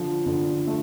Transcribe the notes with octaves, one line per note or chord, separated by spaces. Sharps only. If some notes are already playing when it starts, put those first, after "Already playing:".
Already playing: D3 F3
D3
A3